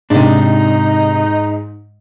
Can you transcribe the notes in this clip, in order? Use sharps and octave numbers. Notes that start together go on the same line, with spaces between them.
G#2 C3 D4 D#4